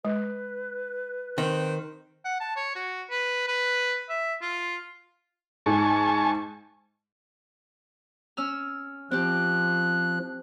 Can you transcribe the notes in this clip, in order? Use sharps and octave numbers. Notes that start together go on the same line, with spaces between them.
G#3 B4
D#3 C4
F#5
A5
C#5
F#4
B4
B4
E5
F4
G#2 G#5 A5 C#6
C#4 E6 F6
F3 C4 G4 F#6